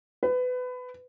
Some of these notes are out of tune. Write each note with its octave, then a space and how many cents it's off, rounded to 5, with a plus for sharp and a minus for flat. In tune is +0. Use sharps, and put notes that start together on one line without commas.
B4 +25